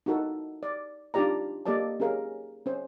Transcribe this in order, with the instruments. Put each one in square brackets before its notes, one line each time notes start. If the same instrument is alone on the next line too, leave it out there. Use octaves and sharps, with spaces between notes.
[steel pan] D#4 E4 F#4 A4 A#4
D5
D4 D#4 F4 G4 D5 A#5
A#3 G4 A4 D5 D#5 A5
C#4 G4 G#4 A#4 F5
C#4 C5